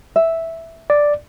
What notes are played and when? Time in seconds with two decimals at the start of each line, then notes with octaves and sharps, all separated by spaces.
0.16 E5
0.90 D5